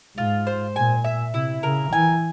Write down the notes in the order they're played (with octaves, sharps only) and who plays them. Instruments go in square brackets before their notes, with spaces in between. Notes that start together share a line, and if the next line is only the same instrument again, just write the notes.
[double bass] G#2 [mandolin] F4
[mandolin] C5
[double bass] A#2 [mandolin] G#5
[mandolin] E5
[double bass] C3 [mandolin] E4
[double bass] C#3 [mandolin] A#4
[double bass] E3 [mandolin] G#5